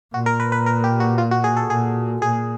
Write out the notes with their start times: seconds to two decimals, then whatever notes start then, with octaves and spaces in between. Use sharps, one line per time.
0.14 A#2 F#4
0.26 A#4
0.40 B4
0.52 B4
0.66 A#4
0.84 G4
1.00 F#4
1.18 F4
1.31 F#4
1.44 G#4
1.57 A4
1.70 A#2 G#4
2.22 A#2 G#4